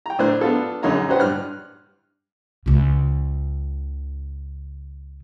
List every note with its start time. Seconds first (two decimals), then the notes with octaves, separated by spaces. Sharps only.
0.06 G5 A#5
0.19 A2 D4 C5 F#6
0.41 B3 D4 F4 A4
0.83 A#1 F#2 D3 D#4 C#5 A#5
1.08 C#4 D4 G4 B4 C5 F#5
1.20 G2 F6 F#6
2.66 C#2 C#3